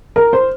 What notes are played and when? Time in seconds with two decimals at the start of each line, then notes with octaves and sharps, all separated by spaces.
0.16 A#4
0.33 C5